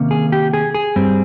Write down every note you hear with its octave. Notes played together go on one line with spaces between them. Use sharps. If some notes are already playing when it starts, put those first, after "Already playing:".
Already playing: C3 D#3 A#3 C#4
G#4
G4
G#4
G#4
G2 G3 C4